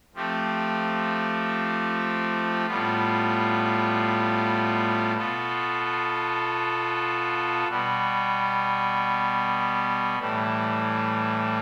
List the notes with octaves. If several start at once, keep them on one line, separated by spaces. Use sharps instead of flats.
F3 A3 C4 G4
A2 G3 B3 F4
B2 B3 F4 A4
B2 G3 B3
A2 E3 G3